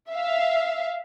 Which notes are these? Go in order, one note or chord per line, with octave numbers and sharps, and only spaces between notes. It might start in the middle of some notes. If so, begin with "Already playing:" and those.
E5 F5